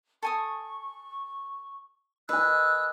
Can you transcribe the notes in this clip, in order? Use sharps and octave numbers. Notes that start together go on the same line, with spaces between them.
A4 G#5 C#6 D#6
B4 D#5 G#5 E6 F#6